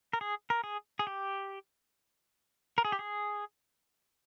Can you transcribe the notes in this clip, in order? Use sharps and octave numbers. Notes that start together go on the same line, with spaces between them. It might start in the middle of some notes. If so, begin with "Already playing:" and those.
A#4
G#4
A#4
G#4
G#4
G4
A#4
G#4
G4
G#4